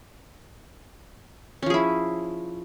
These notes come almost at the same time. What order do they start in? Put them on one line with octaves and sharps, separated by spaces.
C#4 F3 G#4 E4